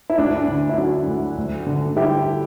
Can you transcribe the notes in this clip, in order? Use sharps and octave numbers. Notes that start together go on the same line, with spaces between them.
E4
D2 D4
D3
E4
F#3 D4 F#4
D2
D2
D3
G3 E4 G4